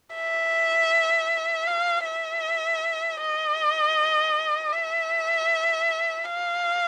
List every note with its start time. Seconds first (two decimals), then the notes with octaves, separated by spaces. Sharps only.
0.15 E5
1.67 F5
2.05 E5
3.21 D#5
4.72 E5
6.24 F5